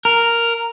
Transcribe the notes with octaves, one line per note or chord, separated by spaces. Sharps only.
A#4